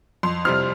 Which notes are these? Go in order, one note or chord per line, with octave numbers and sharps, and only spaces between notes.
F2 C6
C3 G3 C4 F6